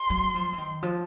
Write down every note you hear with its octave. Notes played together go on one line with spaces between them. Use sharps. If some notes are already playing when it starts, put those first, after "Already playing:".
Already playing: C6
F#3
F3
E3
D#3
F3